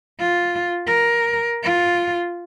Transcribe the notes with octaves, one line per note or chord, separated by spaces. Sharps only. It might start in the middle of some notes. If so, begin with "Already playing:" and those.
F4
A#4
F4